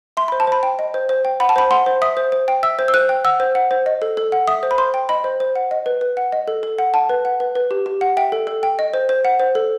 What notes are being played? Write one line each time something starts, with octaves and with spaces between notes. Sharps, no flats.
E5 C6
C5 B5
A5
C5 B5
G5
D#5
C5
C5
G5
F#5 B5
A5
C5 B5
F#5 C6
C5
E5 D#6
C5
C5
G5
E5 E6
C5
E6
C5 F#6
G5
F#5 E6
C5
F#5
C5
D#5
A4
A4
F#5
E5 D#6
C5
B5
C5 C6
G5
D#5 B5
C5
C5
F#5
D#5
B4
B4
F#5
D#5
A4
A4
F#5
F#5 A5
B4
F#5
B4
B4
G4
G4
F#5
E5 G5
A4
A4
G5
D#5
C5
C5
F#5
C5
A4